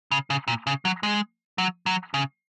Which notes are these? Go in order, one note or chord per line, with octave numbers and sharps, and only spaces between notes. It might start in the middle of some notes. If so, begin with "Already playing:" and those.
C#3
C#3
A#2
C#3
F#3
G#3
F#3
F#3
C#3